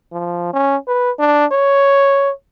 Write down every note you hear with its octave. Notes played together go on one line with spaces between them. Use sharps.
F3
C#4
B4
D4
C#5